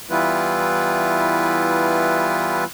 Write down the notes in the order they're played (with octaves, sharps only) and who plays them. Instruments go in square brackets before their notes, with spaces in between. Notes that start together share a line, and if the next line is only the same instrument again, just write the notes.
[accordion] E3 G3 B3 E4 F4 B4